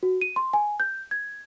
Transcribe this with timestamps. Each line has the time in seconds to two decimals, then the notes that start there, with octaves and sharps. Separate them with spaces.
0.03 F#4
0.21 D#7
0.36 C6
0.53 G#5
0.80 G6
1.11 G#6